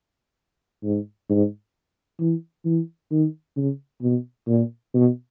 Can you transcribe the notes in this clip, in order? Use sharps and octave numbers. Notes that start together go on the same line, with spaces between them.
G#2
G#2
E3
E3
D#3
C#3
B2
A#2
B2